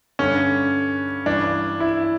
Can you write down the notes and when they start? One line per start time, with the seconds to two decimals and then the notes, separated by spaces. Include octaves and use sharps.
0.19 G2 D3 C#4
1.26 G2 E3 D4
1.80 E4